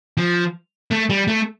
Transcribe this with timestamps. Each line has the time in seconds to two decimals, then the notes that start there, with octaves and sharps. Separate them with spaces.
0.18 F3
0.91 A3
1.10 G3
1.28 A3